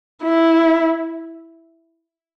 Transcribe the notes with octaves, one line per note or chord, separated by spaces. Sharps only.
E4